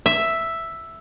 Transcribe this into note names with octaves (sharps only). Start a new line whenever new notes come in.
E5